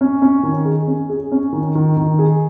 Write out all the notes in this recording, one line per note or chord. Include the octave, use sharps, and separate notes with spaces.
C#4
C#4
D#3
G#4
C#4
G#4
C#4
D#3
D#3
D#3
G#4